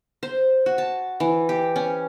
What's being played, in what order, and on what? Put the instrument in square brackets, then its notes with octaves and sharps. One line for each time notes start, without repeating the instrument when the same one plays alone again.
[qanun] C5
F#4
A5
E3
G4
C#4